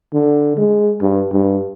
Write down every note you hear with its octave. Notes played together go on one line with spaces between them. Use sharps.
D3
G#3
G2
G2